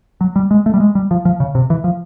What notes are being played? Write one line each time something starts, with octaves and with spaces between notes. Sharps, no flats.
F#3
G3
G#3
A3
G3
G#3
G3
F3
F3
C#3
C3
E3
F3